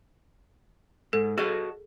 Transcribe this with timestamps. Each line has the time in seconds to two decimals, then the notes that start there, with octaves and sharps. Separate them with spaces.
1.13 G#2 A4
1.38 F#4 G#4 A4 D#5